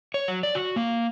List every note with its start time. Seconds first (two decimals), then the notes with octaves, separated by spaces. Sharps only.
0.14 C#5
0.28 F#3
0.43 D5
0.55 F#4
0.76 A#3